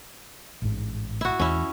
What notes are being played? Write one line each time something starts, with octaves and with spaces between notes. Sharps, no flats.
A1 G#2
E4 F#4
E2 C#4 E4